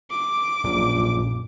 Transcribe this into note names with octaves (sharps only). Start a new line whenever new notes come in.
D6
A#1 F#2 A#2